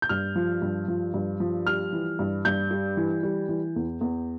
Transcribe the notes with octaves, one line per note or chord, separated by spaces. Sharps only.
G6
G2 F6
F3
G2
F3
G2
F3
G3 F6
E3
G2
G2 G6
G3
E3
G3
E3
E2
E2